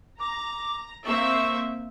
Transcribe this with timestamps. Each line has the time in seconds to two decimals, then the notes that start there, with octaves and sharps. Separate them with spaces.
0.20 A#5 D6
1.06 A#3 C4 E5 C#6